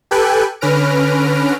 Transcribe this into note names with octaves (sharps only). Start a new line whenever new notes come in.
G4 A4 B4 G5 G#5 F#6
D3 C#4 B4 F6 A#6 D7